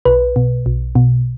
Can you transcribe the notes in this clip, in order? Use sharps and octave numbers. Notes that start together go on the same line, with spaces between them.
B1 B4
B2
B1
B2